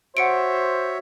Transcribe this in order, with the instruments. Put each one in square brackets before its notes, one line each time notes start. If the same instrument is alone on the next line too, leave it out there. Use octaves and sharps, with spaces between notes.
[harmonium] F#4 C#5 E5 [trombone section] C5 [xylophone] F#5 C#7 D7